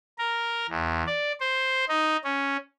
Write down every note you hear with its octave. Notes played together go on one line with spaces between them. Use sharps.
A#4
E2
D5
C5
D#4
C#4